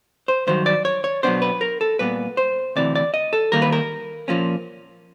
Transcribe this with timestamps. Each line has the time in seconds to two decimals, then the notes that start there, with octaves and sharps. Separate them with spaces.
0.28 C5
0.47 G2 D#3 F#3 C5
0.66 D5
0.85 C#5
1.04 C#5
1.23 B2 F#3 B3 D4 C5
1.42 B4
1.61 A#4
1.81 A4
1.99 A#2 G3 B3 B4
2.37 C5
2.76 D2 C3 E3 D5
2.95 D5
3.14 D#5
3.33 A4
3.52 D#2 D#3 G3 A#3 A#4
3.62 B4
3.72 A#4
4.28 A#2 F3 A#3 C#4